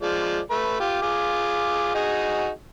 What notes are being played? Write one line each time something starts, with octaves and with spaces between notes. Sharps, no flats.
F3 G#3 D5
A3 B4
F4 G4
F4 G#4 D6
D#4 F#4 G#4